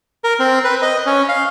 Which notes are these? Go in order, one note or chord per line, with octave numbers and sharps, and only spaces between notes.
A#4
C4
B4
D#5
C#4
F5